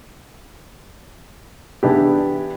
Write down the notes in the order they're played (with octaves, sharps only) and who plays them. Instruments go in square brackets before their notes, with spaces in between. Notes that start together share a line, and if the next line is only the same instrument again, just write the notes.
[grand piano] E3 B3 D4 E4 G4